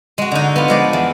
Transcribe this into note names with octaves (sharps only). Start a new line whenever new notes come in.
G#3 F#4
D3 D#4
B3 F4
F3 G#3 D5
E2